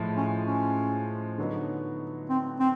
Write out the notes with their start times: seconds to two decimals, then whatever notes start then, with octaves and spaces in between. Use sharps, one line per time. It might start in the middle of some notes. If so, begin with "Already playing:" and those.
Already playing: A2 F3 G#3
0.17 C#4
0.47 C#4
1.38 D3 F#3 B3 D#4
2.30 C4
2.60 C4